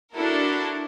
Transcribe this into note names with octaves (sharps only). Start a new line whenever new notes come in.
D4 E4 F#4 A4 A#4